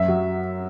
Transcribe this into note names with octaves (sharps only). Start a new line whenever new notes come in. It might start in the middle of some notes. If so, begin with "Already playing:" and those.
Already playing: F#2 E5
F#3